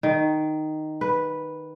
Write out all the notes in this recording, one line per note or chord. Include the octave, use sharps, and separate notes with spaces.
D#3
B4